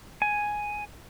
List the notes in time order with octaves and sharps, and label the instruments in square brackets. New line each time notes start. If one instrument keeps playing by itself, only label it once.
[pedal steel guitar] G#5